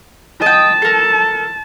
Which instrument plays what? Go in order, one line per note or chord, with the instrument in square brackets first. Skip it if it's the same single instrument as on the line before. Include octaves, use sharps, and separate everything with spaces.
[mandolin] D#5 G5 [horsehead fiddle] A5
[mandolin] A4 A#4